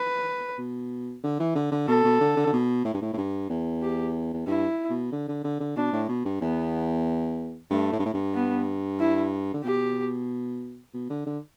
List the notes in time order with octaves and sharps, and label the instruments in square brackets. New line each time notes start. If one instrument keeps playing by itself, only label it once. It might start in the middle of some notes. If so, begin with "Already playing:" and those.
Already playing: [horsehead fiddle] B4
[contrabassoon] B2
D3
E3
D3
D3
[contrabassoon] B2 [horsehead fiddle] A4
[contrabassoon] B2
D3
D3
D3
B2
A2
G2
A2
A2
G2
E2
[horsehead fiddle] G4
[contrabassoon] E2
[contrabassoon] G2 [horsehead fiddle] E4
[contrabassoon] B2
D3
D3
D3
D3
[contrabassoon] B2 [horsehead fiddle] D4
[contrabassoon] A2
B2
G2
[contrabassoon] E2 [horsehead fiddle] B3
[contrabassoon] G2 [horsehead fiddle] A3
[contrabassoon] A2
G2
A2
G2
[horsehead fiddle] B3
E4
[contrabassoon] D3
[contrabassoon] B2 [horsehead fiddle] G4
[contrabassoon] B2
D3
D3